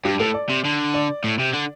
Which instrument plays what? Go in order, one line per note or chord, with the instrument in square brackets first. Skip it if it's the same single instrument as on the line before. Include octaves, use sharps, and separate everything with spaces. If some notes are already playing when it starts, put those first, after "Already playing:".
[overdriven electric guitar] G2 [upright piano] G4
[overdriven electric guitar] A2 [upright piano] A4
[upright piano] D5
[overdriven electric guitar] C3
D3
[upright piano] D5
[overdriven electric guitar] A2
C3
D3